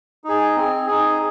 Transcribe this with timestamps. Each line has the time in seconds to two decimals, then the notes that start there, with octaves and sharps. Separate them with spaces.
0.24 D#4 G#4
0.57 C4
0.87 D#4 G#4